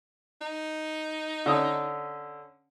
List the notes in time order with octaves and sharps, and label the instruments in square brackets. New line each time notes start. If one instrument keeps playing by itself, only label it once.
[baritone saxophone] D#4
[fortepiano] D3 C#4 D#6